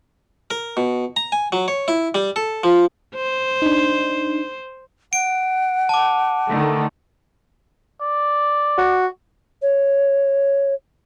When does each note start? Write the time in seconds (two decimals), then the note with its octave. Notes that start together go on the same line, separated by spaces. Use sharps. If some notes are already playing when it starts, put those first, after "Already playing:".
0.51 A#4
0.77 B2
1.16 A#5
1.32 G#5
1.52 F#3
1.68 C#5
1.88 E4
2.15 G3
2.36 A4
2.64 F3
3.15 C5
3.62 D4 D#4
5.13 F#5 D7
5.89 A5 D6
6.49 D3 D#3 A3
8.01 D5
8.78 F#4
9.62 C#5